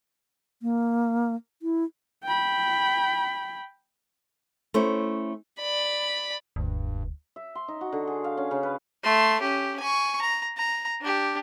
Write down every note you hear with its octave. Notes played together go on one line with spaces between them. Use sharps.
A#3
E4
G5 B5
A3 C#4 E4 C5
D5 B5
E1 D2 G2
E5
C6
D#4
F#4
D3
G#4
F5
C#4
C#3
B4
A3 C6
C#4 G4
G#5 C#6
A#5
A#5
D4 G4